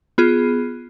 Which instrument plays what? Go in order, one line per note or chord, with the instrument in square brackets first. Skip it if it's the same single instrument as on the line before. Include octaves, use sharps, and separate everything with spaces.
[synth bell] B3 F4 G#4